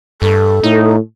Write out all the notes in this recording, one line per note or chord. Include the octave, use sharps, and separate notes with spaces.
G2 A4
A2 D#4